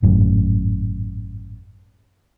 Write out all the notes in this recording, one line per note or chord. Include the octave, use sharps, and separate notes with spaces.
G#1 F#2 A2